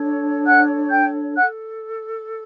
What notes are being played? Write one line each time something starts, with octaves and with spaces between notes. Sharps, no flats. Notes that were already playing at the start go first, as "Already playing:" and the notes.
Already playing: D4 A4 C#5
F#5 F#6
G5 G6
A4 F#5 F#6